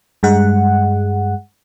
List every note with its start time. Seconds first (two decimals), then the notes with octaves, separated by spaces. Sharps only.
0.23 G2 G#3 F#5